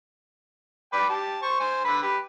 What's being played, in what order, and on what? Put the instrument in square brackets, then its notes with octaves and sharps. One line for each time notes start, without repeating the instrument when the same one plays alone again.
[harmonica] B4 D5 G5
G4 A5
C5 C#6
C5 G#5
D3 B4 B5
G4 B4